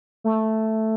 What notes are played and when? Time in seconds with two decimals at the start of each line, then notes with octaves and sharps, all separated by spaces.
0.24 A3